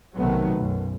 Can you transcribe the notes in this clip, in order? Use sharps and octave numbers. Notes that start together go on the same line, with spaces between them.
B1 C3 D#3 F#3 A3 B3
B1 F#2